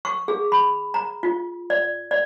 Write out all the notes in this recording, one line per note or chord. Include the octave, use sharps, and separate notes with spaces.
C#6
G#4
B5
A#5
F4
D5
D5